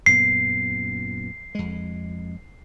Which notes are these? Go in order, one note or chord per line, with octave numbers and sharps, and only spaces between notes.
F#2 A#2 B3 C7
F2 G#3